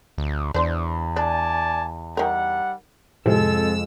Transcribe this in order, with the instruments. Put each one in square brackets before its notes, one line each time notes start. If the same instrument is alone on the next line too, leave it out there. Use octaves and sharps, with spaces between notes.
[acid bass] D2
[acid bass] E2 [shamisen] D4 C5
[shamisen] D4 [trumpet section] D5 G#5 A5
[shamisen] D#3 A#4 [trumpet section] G3 F#5
[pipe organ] F2 E6 [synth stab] A2 C3 F3 [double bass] G#3 [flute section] A4